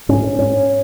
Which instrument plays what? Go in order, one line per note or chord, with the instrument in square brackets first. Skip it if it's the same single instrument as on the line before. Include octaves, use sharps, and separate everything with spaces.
[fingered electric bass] G#2 C#4
G#2 C#4